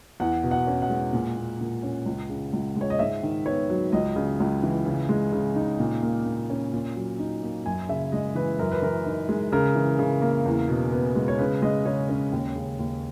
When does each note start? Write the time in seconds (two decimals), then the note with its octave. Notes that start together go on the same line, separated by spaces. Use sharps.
0.20 E2 F#5
0.43 B2
0.51 F#5
0.67 C#4
0.82 F#5
0.90 G#3
1.13 A#2
1.37 A#3
1.60 A#2
1.83 C#4
2.06 C#2
2.30 C#3
2.53 C#2
2.76 G#3 C#5
2.90 D#5
2.99 G#2 E5
3.23 D#3
3.46 B3 C#5
3.70 F#3
3.92 C#2 D#5
4.16 C#3
4.40 C#2
4.63 E3
4.86 C#3
5.09 G#3
5.33 C#3
5.56 D#4
5.79 A#2
6.03 A#3
6.26 A#2
6.50 C#4
6.73 A#2
6.96 F#3
7.19 D#4
7.42 A#3
7.66 F#2 G#5
7.89 C#3 E5
8.12 G#3 D#5
8.35 E3 B4
8.59 F#2 A#4
8.71 B4
8.82 E3 A#4
9.06 D#4
9.29 G#3
9.52 C#3 A#4
9.75 E3
9.99 C#3
10.22 A#3
10.46 E2
10.69 B2
10.92 B3
11.16 G#3
11.28 C#5
11.39 C#3 B4
11.62 G#3 D#5
11.86 C#3 C#5
12.09 C#4
12.32 D#2
12.55 C#3
12.79 D#2